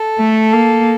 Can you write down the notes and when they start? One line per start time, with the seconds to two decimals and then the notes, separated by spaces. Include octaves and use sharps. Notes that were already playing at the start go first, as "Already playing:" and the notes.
Already playing: A4
0.18 A3
0.53 A#3